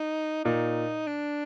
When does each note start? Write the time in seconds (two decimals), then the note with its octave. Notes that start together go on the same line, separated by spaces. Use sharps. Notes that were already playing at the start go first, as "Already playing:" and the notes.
Already playing: D#4
0.44 A#2 D#4
1.07 D4